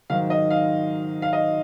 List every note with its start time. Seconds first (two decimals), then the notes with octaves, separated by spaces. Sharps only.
0.10 G#2 D#3 F#3 F5
0.30 D#5
0.50 F5
1.22 F5
1.33 D#5